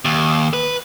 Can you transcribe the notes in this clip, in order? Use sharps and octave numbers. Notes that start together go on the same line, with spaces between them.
D#2
B4